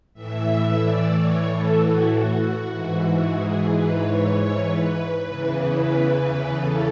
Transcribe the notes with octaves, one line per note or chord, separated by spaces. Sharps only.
A2 E3 E5
D5
C#5
A4
F#4
F#4
G#2 E3
G#4
B4
C#5
C#5
B4
E2 C#3 E3
B4
A4